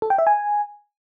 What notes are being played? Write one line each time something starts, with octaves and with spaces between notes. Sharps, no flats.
A4
G5
E5
G#5